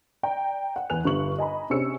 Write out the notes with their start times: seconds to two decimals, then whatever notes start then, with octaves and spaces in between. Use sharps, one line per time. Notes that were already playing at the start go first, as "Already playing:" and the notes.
0.23 D5 G5 A#5
0.76 F#5
0.90 E2 E3 B3 G#5 F#6 F7
1.04 G1 G2 B3 C#6 F#7
1.39 D#5 G#5 A#5 B5
1.70 C3 C#4 D4 G#4 E6 C#7